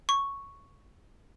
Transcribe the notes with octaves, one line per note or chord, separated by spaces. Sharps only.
C#6